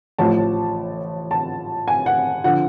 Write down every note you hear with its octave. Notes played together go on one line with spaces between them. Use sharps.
A1 A2 F3 A5
A5
G#5
F#5
D3 F3 F#5